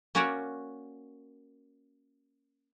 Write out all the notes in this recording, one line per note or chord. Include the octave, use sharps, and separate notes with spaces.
A#3 C#4 F#4 C#5 D5 F#5